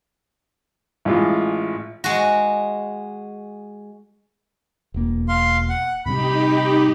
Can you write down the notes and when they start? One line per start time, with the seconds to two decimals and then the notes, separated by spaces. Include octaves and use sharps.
1.05 A1 G#3 F4
2.04 G#3 F#4
4.94 E1 A#3
5.28 F5 C6
5.69 F#5
6.06 A2 C3 G3 D#4 G4 B5